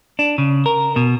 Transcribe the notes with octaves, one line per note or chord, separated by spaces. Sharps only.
D4
C#3
A#4
B2